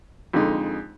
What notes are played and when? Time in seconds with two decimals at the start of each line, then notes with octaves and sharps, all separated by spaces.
0.33 F2 D3 G#3 D#4